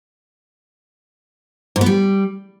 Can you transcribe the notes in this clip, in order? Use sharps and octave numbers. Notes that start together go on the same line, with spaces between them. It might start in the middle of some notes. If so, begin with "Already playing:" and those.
G#2
B3
G3